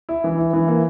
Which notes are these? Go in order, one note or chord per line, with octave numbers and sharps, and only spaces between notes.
E4
E3
E4
E3
A#3